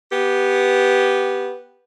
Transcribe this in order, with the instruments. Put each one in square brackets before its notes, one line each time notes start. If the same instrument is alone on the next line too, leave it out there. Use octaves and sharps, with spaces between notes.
[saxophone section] B3 G4